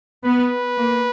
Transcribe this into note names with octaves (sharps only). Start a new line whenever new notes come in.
B3 B4
A#3